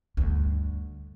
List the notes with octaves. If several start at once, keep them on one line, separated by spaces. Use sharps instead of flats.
D2 G2